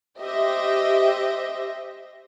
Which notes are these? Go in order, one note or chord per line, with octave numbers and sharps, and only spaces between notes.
G4 C5 D#5 E5